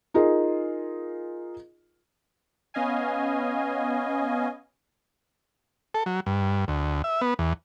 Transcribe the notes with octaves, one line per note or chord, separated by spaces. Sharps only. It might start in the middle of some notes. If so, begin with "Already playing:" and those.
D#4 F4 G#4 A#4
B3 C#4 D#5 F5 G#5
A4
F#3
G2
D2
E5
B3
E2